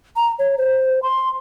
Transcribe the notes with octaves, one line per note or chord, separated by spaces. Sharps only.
A#5
C#5
C5
C6